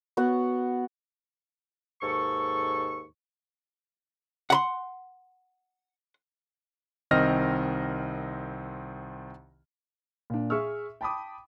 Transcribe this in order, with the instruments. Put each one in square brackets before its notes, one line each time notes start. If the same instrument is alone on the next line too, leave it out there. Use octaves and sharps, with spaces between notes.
[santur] B3 F#4 F#5
[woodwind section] D#2 G#2 A4 C#6
[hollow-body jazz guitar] F#5 B5 C6
[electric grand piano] C2 D#3 C4 D#5 F6 A#6
[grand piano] A#2 D4
G#4 E5 C#6 E6 F6
G5 A5 B5 D6 D#6